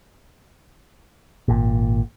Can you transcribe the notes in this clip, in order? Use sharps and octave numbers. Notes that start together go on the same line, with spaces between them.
G#1 A#2